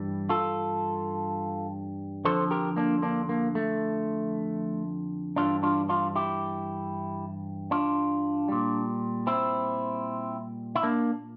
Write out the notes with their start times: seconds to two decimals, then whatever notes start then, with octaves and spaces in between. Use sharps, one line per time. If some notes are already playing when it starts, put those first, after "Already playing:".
Already playing: G2 E3 G3
0.29 F4 A4
2.25 F2 D3 F3 A4 C5
2.51 G4 A#4
2.76 A#3 D4
3.02 A#3 D4
3.29 A#3
3.55 A3
5.36 G2 E3 G3 D4 F4
5.63 D4 F4
5.89 D4 F4
6.16 E4 G4
7.71 D4 F4
8.48 A#2 G3
9.27 C4 E4
10.76 E4
10.83 A#3 D4